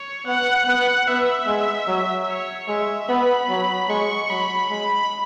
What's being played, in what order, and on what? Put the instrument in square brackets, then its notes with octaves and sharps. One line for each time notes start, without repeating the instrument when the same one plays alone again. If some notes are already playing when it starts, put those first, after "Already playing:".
Already playing: [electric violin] C#5
[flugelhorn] B3 [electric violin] F#5
[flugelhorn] B3
[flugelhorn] B3 [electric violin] E5
[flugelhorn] G#3
F#3
[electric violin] C#5
[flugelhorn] G#3 [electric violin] E5
[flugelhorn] B3 [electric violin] B5
[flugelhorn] F#3
[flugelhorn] G#3 [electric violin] C#6
[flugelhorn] F#3 [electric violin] B5
[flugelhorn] G#3 [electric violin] B5